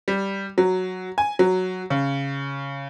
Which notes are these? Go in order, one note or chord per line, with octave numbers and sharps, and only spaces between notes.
G3
F#3
G#5
F#3
C#3